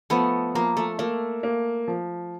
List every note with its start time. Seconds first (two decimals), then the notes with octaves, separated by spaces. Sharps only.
0.10 F3 A3 B3
0.54 F3 A#3
0.77 A3
0.99 A3 A#3
1.43 A#3
1.88 F3